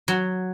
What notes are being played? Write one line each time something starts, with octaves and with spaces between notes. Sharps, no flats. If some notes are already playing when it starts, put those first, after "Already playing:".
F#3